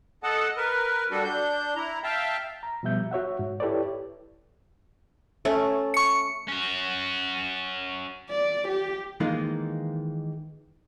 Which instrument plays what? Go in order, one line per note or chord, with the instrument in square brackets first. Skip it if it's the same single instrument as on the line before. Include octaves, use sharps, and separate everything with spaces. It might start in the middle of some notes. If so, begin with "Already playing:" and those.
[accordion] A4 D#5 F#5 A5
A#4 B4
G3 D4 F#4 A4
D4 G6
E4 A#5
E5 F5 G5 A5
[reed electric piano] A#5
B2 F3 G3 B3 E5 G6
F#4 C#5 E5 F#5
G#2
E4 G4 A4 B4 C#5 D5
[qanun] A3 C#4 A4
[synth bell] C#6 C#7
[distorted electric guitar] C#4 F#4
[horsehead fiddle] D5
G4
[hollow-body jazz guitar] D#3 E3 G#3 A#3 D#4 F4